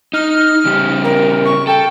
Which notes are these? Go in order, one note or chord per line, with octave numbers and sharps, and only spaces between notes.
D#4 F6
C#3 G3 G4
A#4
C#6
A4 G5